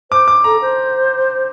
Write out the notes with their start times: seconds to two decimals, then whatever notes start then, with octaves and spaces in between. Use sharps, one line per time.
0.11 C5 D6
0.28 D6
0.44 A4 A#5
0.62 C5